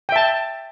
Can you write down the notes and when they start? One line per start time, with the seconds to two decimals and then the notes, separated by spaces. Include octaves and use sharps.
0.09 G5
0.12 E5
0.16 A5